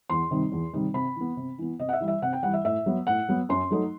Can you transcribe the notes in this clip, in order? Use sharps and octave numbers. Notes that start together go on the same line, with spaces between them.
E2 C6
C3 D#3 G3 D#4
E2
C3 D#3 G3 D#4
C3 B5
E3 B3
C3
E3 B3
C3 D#5
F#5
E5
E3 G3
E5
C3 F#5
G5
E3 G3 F#5
E5
A2 E5
F#3 B3
A2 F#5
F#3 B3
F#2 C6
F#3 A3 D#4